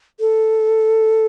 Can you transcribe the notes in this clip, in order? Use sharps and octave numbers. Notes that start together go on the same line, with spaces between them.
A4